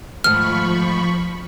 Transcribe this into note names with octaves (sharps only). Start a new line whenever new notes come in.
G#2 D#3 F3 A3 B5 C#6 F6